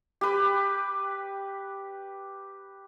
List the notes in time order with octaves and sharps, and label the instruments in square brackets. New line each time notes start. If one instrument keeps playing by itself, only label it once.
[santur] G4 B4